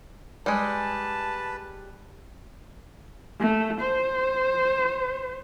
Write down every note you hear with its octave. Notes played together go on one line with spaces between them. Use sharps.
G3 G#3 B4 A5
A3
C5